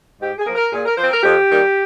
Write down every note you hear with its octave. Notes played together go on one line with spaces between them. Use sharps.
G#2 G4
G#4
F3 A#3
A#4
A#2 G#4
A#4
F3 C4 C5
A#4
F2 G4
D#3 G3 A#3